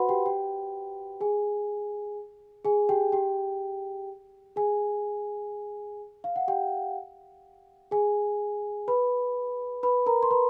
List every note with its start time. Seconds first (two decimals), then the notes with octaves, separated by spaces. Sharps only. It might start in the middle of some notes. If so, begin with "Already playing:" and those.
Already playing: F#4 B4 C5 F#5 B5 C6
0.09 G4 G5
0.26 G4 G5
1.21 G#4 G#5
2.65 G#4 G#5
2.89 G4 G5
3.12 G4 G5
4.56 G#4 G#5
6.24 F5
6.36 F#5
6.48 G4 G5
7.91 G#4 G#5
8.88 B4 B5
9.83 B4 B5
10.06 A#4 A#5
10.23 C6
10.31 B4 B5